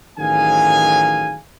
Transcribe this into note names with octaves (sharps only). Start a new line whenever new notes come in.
A1 D#3 F#3 G#4 F5 G#5